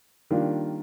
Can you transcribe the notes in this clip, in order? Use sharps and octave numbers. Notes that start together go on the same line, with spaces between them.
D#3 G3 A#3 D4 F4